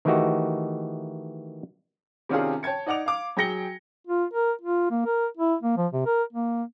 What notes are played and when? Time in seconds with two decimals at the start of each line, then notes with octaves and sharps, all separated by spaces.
0.05 D#3 E3 A3 D#4 F#4 G4
2.29 C3 D#3 C#4 D4 F4 G#4
2.63 C#5 G5 A5 G#6 C#7
2.87 D#4 D5 F#5 D6 F7
3.06 F5 D6
3.37 F#3 G#4 G5 A#6 C#7 G7
4.07 F4
4.33 A#4
4.61 F4
4.90 A#3
5.06 A#4
5.37 E4
5.63 A#3
5.77 F3
5.93 C3
6.06 A#4
6.33 A#3